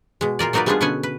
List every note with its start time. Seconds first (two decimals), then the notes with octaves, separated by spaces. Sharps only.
0.21 B2 G#3
0.39 A#2 F4 A#4 D5
0.53 F#3 A#3 D#4 A#4 B4 D5
0.66 G3 G#3 B3 D4 F4 G#4
0.81 B2 D3 B3 C#4 F#5 G#5
1.03 B4